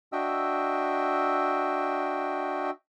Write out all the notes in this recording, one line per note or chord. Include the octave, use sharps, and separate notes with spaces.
D4 F#4 D#5 E5 G5 E6